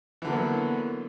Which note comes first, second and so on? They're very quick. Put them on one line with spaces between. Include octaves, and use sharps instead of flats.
E3 D3 A#3 B3 F#3